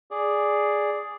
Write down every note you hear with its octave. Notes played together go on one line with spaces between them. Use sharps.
G#4 D5